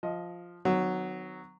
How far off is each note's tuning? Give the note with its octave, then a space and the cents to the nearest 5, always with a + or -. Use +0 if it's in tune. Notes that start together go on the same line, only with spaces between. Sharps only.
F3 +0 D#5 +20
D#3 -25 F#3 +0 B3 +45